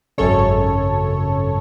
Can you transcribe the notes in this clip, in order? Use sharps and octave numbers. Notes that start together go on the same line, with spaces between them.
G#1 F#2 C#3 A4 C#5